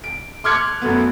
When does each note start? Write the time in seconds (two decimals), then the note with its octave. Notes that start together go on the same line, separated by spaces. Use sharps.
0.04 D7
0.44 C6 D6 F6 F#6 G#6 C#7
0.82 F#2 A3 B3